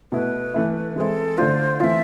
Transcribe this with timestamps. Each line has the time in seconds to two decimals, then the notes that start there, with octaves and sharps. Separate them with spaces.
0.12 B2 A3 E4 B4
0.54 E3 A3 E4
0.96 E3 G#3 C4 E4 A4 B4
1.38 D3 A3 D4 F4 C5
1.80 E3 A3 C4 F4 E5 F5